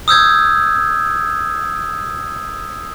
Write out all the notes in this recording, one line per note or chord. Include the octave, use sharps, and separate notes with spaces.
D#6 E6 G6 G#6